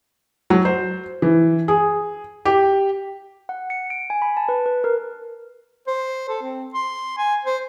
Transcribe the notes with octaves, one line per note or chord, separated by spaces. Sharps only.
F#3
C5
E3
G#4
G4
F#5
C#7
D7
G#5
B5
A5
B4
B4
A#4
C5
A4
C4
C6
G#5
C5